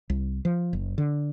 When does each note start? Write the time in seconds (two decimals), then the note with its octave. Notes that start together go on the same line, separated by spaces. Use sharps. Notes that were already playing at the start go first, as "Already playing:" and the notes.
0.10 C2
0.45 F3
0.73 F#1
0.98 D3